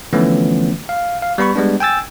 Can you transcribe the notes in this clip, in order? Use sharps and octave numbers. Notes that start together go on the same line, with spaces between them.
D3 E3 F3 A3 B3 C#4
F5
F5
G3 B3 B5 C#6
G3 G#3 B3 D4
G5 G#5 E6 A6